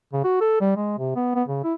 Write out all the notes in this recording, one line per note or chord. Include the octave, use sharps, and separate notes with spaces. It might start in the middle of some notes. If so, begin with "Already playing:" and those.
C#3
F#4
A4
G3
G#3
C3
B3
B3
C#3
E4